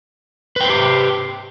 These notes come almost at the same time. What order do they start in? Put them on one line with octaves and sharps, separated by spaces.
B4 G5 C5 G4